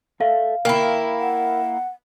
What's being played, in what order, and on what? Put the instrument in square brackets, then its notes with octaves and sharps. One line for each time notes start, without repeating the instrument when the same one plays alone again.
[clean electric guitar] A4 E5 [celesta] F5
[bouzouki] A#3 E4 [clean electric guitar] A#4 G5
[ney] F#5